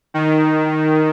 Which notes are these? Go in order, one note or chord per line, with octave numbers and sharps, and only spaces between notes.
D#3